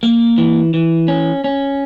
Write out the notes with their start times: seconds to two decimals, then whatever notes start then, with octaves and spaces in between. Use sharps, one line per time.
0.03 A#3
0.38 E3
0.74 E3
1.08 C#4
1.44 C#4